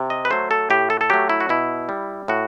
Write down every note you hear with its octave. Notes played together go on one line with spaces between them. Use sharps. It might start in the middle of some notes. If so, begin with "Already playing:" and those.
Already playing: C3
D#5
B4
F#3 A3 C5
A4
A2 G4
A4
A4
F#3 A3 G4
E4
F#4
B2 E4
G3
A2 F#4